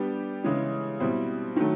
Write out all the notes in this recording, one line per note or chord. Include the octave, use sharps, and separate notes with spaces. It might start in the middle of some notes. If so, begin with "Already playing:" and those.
Already playing: G3 B3 D4 G4
C#3 E3 G#3 C#4
B2 G3 C4 E4
D#3 F#3 A3